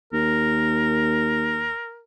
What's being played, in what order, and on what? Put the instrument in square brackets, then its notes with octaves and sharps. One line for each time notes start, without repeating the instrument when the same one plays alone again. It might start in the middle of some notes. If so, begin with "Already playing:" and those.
[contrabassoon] D#2 [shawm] A#4